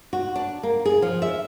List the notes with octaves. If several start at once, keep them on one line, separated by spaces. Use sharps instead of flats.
F#4
D4
A#3
G#4
F3
E5